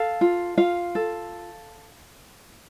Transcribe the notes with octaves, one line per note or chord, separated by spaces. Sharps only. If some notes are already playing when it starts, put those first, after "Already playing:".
Already playing: A4 F5
F4
F4 F5
A4